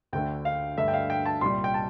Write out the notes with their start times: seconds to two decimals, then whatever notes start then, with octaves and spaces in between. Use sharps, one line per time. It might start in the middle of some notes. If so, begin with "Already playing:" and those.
0.13 D2 D3 A3 G5
0.45 F5
0.77 G2 D3 A3 E5
0.88 G5
0.94 F5
1.10 G5
1.26 A5
1.41 C2 A#2 G3 C6
1.64 G5
1.74 A5